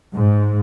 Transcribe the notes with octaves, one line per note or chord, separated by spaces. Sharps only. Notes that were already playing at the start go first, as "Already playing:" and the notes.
G#2